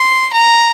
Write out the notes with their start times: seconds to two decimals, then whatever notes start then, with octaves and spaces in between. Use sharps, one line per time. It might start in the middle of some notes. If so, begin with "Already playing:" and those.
Already playing: C6
0.33 A#5